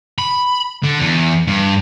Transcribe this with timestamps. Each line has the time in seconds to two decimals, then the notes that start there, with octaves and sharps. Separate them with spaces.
0.18 B5
0.83 D3
0.99 E2
1.47 G2